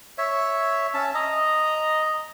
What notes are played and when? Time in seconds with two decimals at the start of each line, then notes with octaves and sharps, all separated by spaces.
0.18 C#5 E5
0.94 C#4 E5 A5
1.15 D#5 A#5